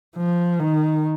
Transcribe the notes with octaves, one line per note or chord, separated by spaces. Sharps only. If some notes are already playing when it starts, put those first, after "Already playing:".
F3
D#3